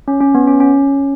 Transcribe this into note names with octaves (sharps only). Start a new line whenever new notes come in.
C#4
C#4
B3
C#4
C#4